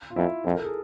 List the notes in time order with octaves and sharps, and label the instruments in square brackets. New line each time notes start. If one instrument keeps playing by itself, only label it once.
[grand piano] F4
[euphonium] F2 [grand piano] E4
[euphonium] F2 [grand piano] E4
[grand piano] A#4
A4
G#4